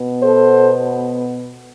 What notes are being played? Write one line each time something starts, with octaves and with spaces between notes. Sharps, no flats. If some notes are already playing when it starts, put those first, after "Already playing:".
Already playing: B2 B3
A4 C5